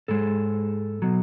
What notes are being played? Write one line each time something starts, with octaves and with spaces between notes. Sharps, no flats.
G#2 G#3 A4
B2 F#3